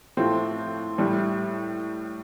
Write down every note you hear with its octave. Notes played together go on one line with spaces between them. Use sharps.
A2 F3 A3 C4
A2 G3